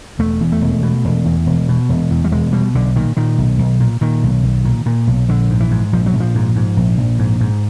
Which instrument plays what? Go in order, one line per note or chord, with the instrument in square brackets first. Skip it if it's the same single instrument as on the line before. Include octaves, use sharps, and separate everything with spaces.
[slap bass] E1 A3
E2
A3
E1
B2
E1
E2
E1
B2
E1
E2
G3
E1 G#3
B2 G3
B1 D3
A#2 D#3
A#2 D#3
B1
B1
A#2
A#2 D#3
B1
B1
A#2
A#2
B1
A#1 D3
G#2
E3
G#2
A#1 F3
F#3
A#1
F3
G#2
G#2
A#1
A#1
G#2
G#2